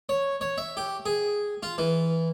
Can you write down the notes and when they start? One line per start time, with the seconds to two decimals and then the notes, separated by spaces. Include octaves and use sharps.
0.09 C#5
0.41 C#5
0.58 E5
0.77 G4
1.06 G#4
1.63 F4
1.78 E3